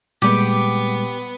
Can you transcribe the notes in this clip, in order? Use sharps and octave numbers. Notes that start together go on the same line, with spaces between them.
A#2 G3 G#3 B3 G4